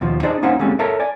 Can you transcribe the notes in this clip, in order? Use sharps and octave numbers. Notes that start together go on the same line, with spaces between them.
D#2 B2 F3
D4 D#4 G#4 C5 D5 D#5
A#3 C#4 D#4 C5 C#5 F#5
D3 G3 G#3 A#3 C4 C#4
A4 A#4 C#5 E5 A5 A#5
D5 G#5